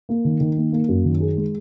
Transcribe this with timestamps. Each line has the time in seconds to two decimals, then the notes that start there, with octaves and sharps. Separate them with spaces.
0.09 A#3
0.25 D#3
0.40 D#3
0.57 A#3
0.72 A#3
0.89 F#2
1.05 D#3
1.20 G#4
1.37 G#3